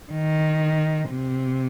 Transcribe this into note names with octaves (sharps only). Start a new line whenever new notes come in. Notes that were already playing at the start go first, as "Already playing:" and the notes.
D#3
C3